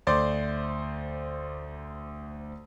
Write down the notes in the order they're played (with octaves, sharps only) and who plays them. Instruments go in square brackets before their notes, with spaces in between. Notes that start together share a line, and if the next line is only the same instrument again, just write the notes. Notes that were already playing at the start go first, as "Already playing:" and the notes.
[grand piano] D2 C5 D5 C6 D6 A6